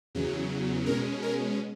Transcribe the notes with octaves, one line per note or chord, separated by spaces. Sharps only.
E2 C#3 F#3
B2 G#3 C#4 A#4
A#4